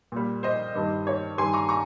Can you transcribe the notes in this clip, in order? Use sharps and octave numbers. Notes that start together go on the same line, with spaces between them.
A#2 G3
C5 D#5
G2 D#3 G3
C#5
G2 D#3 G3 G#5 C6
A#5 C#6
A#5 C#6